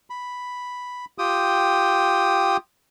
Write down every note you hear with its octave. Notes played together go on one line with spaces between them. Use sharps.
B5
F4 G4 G5 D#6